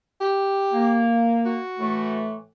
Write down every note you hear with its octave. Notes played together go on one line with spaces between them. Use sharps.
G4
A#3
F#4
A2 E3 A3